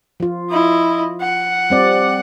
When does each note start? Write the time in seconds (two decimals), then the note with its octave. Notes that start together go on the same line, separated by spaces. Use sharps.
0.20 F3 F4
0.50 E4 D#5
1.21 F#5
1.70 G3 C4 D5